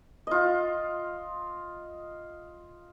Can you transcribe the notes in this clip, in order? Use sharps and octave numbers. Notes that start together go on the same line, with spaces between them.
F4 D#5